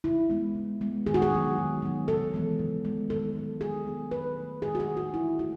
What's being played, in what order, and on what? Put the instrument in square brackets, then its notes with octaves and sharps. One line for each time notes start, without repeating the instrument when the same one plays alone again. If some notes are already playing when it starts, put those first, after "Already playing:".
[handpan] C#3 E4
G#3 B3
C#3
G#3 B3
D#3 G#4
F#4
G#4
F#3 B3
D#3
F#3 B3
C#3 A4
E3 G#3 B3
C#3
E3 G#3 B3
D#3 A4
F#3 B3
D#3 G#4
F#3 B3
D#3 B4
A3
D#3 G#4
F#4
G#4
A3
F#4
D#3 E4
A3 F#4